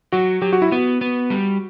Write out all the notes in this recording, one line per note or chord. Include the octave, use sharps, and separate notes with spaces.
F#3 F#4
F#3 G4
F#4
E4
B3 F#4
B3
G3